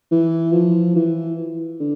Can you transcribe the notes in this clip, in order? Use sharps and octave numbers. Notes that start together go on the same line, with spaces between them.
E3
F3
E3
D3